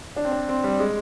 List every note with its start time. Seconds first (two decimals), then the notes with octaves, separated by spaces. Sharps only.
0.16 D4
0.25 C4
0.32 D4
0.49 C4
0.64 G3
0.79 G#3